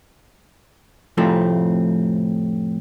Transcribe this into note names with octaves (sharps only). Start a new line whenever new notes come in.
F2 A2 C3 F3 A3 C4